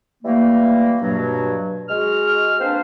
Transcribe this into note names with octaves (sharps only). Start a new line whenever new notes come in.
E3 G3 A3 A#3
G2 B2 F#3
G#3 F#4 F6
A#3 C4 D4 B4 C5